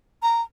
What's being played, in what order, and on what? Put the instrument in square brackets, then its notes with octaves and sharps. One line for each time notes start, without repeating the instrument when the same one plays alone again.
[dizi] A#5